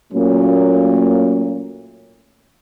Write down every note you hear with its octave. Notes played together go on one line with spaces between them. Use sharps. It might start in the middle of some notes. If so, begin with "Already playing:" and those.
A#2 F#3 A3 A#3 C#4